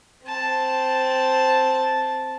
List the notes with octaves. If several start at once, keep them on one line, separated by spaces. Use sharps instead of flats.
C4 A5